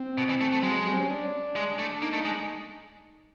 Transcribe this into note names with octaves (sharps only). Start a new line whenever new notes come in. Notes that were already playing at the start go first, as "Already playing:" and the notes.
Already playing: C4
B2
E3
A3
A3
F#3 G#3
G3
C4
C#4
D4
G#3
A3
A#3 D#4
A3
D#4
G#3